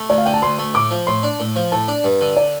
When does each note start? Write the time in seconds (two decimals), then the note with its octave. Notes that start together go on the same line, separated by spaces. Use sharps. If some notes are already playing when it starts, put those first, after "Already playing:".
Already playing: A3
0.10 D2 D5
0.18 F5
0.26 D3 G5
0.34 A5
0.42 D2 C6
0.58 A3
0.74 A2 D6
0.91 F3
1.07 A2 C6
1.23 D4
1.40 A2
1.56 F3
1.72 A2 A5
1.88 D4
2.04 G2
2.21 D3
2.36 D5